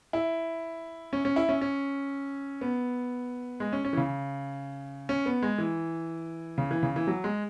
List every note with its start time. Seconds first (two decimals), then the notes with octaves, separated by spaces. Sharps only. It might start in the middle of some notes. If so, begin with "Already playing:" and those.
0.13 E4
1.13 C#4
1.25 C#4
1.36 E4
1.49 C#4
1.61 C#4
2.61 B3
3.60 G#3
3.73 C#4
3.85 C#4
3.93 E3
3.97 C#3
5.09 C#4
5.26 B3
5.43 G#3
5.58 E3
6.58 C#3
6.71 E3
6.83 C#3
6.96 E3
7.07 F#3
7.24 G#3